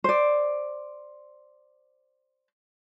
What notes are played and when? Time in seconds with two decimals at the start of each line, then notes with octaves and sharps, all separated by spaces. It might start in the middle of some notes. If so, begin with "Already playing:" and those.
0.04 C5 D5